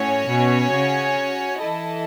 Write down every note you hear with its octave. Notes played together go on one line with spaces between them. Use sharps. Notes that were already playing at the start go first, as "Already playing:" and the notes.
Already playing: A2 C#4 F#4 C#5 G#5
B2
C#3
E3 E4 A4 D#5 A5